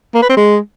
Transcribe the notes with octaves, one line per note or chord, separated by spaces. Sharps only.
A#3
B4
C4
G#3